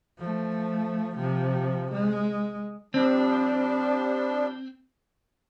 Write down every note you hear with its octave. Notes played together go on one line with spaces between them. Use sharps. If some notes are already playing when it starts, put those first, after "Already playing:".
F3 A3
C3 F3
G#3
F3 G3 C4 D4